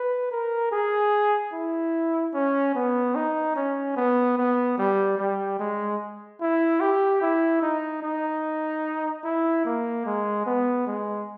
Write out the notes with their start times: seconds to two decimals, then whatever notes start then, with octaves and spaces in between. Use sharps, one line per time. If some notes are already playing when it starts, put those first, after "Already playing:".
Already playing: B4
0.31 A#4
0.71 G#4
1.53 E4
2.34 C#4
2.75 B3
3.15 D#4
3.56 C#4
3.96 B3
4.37 B3
4.78 G3
5.18 G3
5.59 G#3
6.41 E4
6.80 G4
7.21 E4
7.62 D#4
8.03 D#4
9.24 E4
9.65 A#3
10.06 G#3
10.46 B3
10.87 G#3